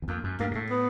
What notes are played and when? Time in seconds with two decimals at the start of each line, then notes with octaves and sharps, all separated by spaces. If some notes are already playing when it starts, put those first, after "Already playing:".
0.02 E2
0.08 F2 A#3
0.24 F#2
0.40 G2 A#3
0.51 G#2
0.55 A2 A3
0.70 B3